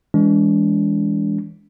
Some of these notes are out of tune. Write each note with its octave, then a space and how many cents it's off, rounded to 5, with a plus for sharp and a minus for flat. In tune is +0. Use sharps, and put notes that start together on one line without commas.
E3 +0 G#3 -20 D4 -40